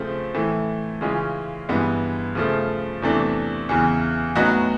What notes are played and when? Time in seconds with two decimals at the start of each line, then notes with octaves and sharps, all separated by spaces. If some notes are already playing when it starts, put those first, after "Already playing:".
Already playing: C#3 F3 A3 C4
0.35 A2 E3 A3
1.01 C#3 E3 G#3 C#4 F4
1.69 G2 E3 G#3 B3
2.35 C#3 F3 A3
3.02 E2 C3 E3 A3 D4
3.69 E2 C#3 E3
4.36 A2 F#3 B3 D#4 F#4